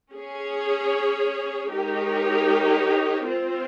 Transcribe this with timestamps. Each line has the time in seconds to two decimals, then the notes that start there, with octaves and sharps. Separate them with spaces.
0.13 C#4 G#4 C#5
1.69 G#3 D#4 G4 A#4 C#5
3.26 C4 F4 C5